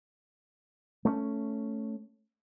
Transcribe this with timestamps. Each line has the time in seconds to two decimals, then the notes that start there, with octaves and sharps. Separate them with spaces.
1.05 A3 B3 C#4